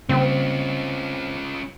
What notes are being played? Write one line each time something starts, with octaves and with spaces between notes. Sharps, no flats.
C#3 G3 A#3 C4 C#4 F4